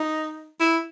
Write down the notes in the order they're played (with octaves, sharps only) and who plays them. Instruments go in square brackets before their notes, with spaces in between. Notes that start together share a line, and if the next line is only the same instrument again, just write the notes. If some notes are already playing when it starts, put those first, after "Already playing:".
Already playing: [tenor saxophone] D#4
E4